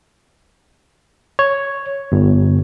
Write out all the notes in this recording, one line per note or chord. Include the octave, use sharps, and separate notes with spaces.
C#5
G1